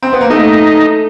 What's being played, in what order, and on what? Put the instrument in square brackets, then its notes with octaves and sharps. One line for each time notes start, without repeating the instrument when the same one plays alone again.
[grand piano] C4
B3
A#3
[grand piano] A3 [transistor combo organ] D#4